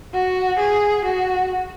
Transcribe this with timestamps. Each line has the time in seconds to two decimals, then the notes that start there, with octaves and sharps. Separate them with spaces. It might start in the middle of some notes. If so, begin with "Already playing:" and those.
0.14 F#4
0.60 G#4
1.06 F#4